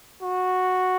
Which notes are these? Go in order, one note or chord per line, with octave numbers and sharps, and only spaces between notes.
F#4